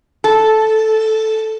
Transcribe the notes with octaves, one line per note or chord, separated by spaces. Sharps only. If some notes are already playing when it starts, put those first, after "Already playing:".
A4